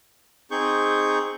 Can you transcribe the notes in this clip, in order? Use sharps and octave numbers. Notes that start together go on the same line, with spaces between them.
C4 D#4 G#4 C#6 G6